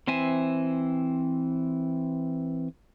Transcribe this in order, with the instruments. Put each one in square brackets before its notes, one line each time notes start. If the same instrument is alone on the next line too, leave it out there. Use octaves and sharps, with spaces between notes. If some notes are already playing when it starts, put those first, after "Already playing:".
[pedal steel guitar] E3 C4 C5 E5 G#5